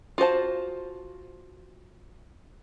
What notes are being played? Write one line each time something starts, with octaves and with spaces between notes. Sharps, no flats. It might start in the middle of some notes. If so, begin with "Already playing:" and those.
F4 F#4 C5 A5